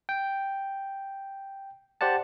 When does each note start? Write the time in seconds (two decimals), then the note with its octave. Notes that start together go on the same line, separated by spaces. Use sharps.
0.09 G5
2.01 G4 C5 D5 F#5 A5